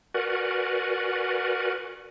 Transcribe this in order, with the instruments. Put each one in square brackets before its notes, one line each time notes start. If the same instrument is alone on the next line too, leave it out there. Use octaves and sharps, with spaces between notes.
[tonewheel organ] F#4 A#4 B4 D5 F#5 G#5